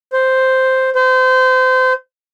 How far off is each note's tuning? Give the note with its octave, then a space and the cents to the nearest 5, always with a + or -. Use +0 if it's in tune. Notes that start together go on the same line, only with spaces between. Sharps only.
C5 +0
C5 -30